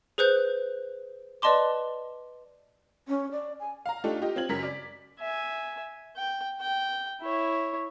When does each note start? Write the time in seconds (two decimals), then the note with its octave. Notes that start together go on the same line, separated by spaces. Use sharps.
0.18 G#4 B4 C5 F#6 G6
1.42 B4 D5 D#5 A5 C6 D6
3.08 C#4
3.31 D5
3.60 G#5
3.86 F5 A#5
4.04 A3 D4 D#4 F4 G4 A4
4.22 F4 G4 D#5
4.36 C4 F4 G#6 F#7
4.49 F#2 C#3 F#3 A#4 B6
4.63 D5
5.19 E5 G#5
6.17 G5
6.60 G5
7.22 E4 C#5